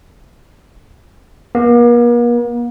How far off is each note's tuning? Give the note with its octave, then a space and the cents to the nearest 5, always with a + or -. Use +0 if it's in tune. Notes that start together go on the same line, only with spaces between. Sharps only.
A#3 +45